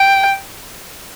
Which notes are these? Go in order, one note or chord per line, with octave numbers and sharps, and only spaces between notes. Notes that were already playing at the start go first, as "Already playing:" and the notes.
Already playing: G5